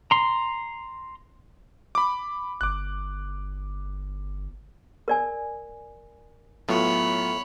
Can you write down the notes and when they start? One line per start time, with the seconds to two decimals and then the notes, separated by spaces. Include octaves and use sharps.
0.11 A#5 C6
1.95 B5 D6
2.61 G1 D6 F#6
5.08 A#4 D5 G#5
6.69 A2 F#3 B3 F4 C#5 B5